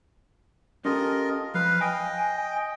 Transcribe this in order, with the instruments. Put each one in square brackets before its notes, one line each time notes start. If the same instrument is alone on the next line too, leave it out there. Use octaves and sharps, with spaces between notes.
[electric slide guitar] C#4 G4 A4 [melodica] F4 A#4 D#5
[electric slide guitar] F3 [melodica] B4 F5
[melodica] D#5 G5 [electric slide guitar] G#5